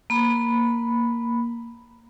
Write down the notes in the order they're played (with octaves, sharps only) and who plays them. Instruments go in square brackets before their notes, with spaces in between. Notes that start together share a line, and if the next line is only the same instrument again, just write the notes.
[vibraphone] A#3 B5